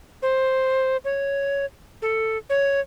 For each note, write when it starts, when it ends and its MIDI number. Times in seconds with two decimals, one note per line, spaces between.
0.22 0.97 72
1.05 1.65 73
2.02 2.38 69
2.50 2.80 73